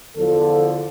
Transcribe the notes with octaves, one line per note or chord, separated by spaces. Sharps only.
E2 D3 F3 A4